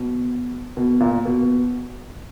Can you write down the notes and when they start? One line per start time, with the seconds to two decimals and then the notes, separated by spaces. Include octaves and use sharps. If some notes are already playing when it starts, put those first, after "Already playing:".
Already playing: B2
0.77 B2
1.00 A#2
1.25 B2